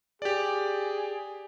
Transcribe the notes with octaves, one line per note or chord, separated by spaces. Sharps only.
G4 G#4 D5